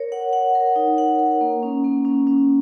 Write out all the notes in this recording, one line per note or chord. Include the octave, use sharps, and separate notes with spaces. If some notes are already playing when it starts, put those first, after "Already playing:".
Already playing: A#4 C#5
F#5
F#5
A#4
D#4
F#5
A#4
A#3
C#4
A#3
C#4
C#4